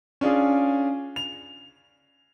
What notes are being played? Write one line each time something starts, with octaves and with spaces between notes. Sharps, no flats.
C#4 D4 F4 G#4
F7